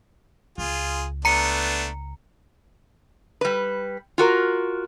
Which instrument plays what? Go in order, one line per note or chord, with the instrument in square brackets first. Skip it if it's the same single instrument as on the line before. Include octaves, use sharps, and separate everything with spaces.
[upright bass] C#2 [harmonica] F4 G#4
[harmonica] A3 B3 D4 [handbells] A#5 C#7
[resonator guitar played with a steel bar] G3 B4
F4 F#4 A#4